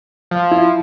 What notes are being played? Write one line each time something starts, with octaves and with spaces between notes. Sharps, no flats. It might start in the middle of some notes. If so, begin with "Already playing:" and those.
F3
E4 F4